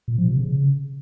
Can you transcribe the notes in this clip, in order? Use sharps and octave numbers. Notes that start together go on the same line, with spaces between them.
A#2
F3
C3
C#3